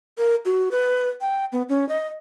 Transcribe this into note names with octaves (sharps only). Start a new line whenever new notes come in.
A#4
F#4
B4
G5
B3
C#4
D#5